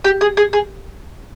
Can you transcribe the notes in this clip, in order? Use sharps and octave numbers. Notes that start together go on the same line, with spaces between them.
G4
G#4
G#4
G#4